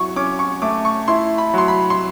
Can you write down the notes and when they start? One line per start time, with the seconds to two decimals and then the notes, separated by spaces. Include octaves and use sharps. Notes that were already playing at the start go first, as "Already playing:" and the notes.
Already playing: F#3 E4 C#6
0.16 C#4 D6
0.39 C#6
0.62 A3 D6
0.85 C#6
1.08 E4 C6
1.38 B5
1.54 F#3 C6
1.68 B5
1.90 C6